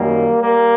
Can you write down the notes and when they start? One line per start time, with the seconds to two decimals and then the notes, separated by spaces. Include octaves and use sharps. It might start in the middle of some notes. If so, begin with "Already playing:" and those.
Already playing: F#2 D#3 G3 A#3
0.42 G3 A#3